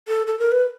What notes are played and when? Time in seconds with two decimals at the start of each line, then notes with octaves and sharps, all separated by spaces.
0.08 A4
0.27 A4
0.39 A#4
0.52 B4